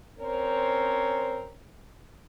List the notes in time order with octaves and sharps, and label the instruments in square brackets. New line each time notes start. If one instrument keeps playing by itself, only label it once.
[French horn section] C4 C#4 A#4 C5 C#5